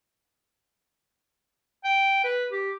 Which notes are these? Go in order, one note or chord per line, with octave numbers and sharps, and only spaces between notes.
G5
B4
G4